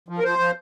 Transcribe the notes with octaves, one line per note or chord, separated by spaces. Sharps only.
F3
A#4
F3 C5
F3